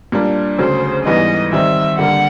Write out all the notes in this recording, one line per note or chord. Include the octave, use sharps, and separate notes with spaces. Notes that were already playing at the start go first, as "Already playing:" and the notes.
A#2 G3 A#3 D4
D2 C#3 F#3 C5
G#2 E3 G3 B3 D#4 D#5
D#3 G3 C4 D#4 E5
D3 G3 A#3 F#5